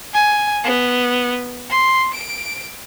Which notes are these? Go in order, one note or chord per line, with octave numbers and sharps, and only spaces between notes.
G#5
B3
C6
D7